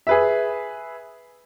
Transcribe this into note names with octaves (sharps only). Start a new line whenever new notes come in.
G#4 B4 E5